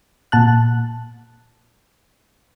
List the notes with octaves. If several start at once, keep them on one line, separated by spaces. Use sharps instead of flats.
A#2 A5 F#6